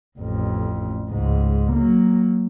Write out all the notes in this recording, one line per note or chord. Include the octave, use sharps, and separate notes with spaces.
A1 F2
C#2 G#2
F#3 A#3